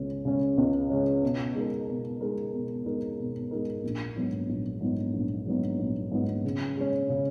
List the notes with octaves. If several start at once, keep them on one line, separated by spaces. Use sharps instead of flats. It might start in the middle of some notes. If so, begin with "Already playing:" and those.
Already playing: C#2 C#3 G#3 C#4
C#3 G#3 C#4
C#2
C#3 G#3 C#4
B2
G#3 D#4 A#4
B2
G#3 D#4 A#4
B2
G#3 D#4 A#4
B2
G#3 D#4 A#4
A#1
G#2 F#3 B3 D#4
A#1
G#2 F#3 B3 D#4
A#1
G#2 F#3 B3 D#4
A#1
G#2 F#3 B3 D#4
C#3
G#3 C#4
C#3